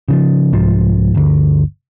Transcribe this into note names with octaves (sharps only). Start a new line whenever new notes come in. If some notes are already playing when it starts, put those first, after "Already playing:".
C#3 E3 F3
C2 G#2 F3
G1 D2